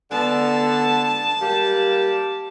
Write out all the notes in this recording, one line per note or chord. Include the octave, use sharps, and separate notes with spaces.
D3 B3 A5
G3 A#3 G4